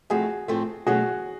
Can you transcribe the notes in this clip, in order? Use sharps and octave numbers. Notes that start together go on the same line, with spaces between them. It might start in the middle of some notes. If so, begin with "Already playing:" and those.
A2 F3 A3 C4 F#4 G#4
A2 F3 A3 C4
B2 F#3 A3 C#4 F#4 G#4